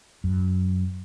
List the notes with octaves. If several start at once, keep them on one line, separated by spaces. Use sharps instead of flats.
F#2